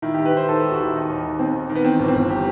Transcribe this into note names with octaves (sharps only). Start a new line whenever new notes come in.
D#3 E4
D#3 G4
B4
D#3 C5
D#3 A4
D#2 G4
F#4
D#3 E4
D#3 D#4
D#2
D#3
D#2 C4
D#3
D#3
B3
E3 C4
G1
C4
G1
G4